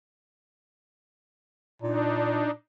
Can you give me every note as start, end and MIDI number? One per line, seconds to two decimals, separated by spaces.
1.82 2.53 46
1.82 2.51 62
1.82 2.51 63